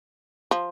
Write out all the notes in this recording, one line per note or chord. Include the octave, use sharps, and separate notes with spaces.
F3